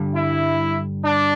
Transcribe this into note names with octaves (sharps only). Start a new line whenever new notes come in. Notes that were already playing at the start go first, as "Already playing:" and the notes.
Already playing: G2 D3 G3
E4
D4